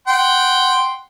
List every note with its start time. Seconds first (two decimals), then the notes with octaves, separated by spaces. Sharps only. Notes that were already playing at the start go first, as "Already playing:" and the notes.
0.08 F#5 G5 C6